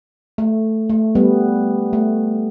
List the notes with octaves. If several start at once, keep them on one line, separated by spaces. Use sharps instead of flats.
A3
A3
G3 B3
A3